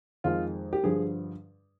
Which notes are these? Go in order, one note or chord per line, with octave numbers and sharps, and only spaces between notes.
F2 D#3 G#3 F4
G4
G2 D3 F3 G#4